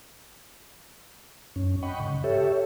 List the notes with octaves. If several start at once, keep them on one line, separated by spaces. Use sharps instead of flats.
F#2 C#4
D#5 F#5 G5 B5 C#6
G#2 C#3
G4 A4 C#5 E5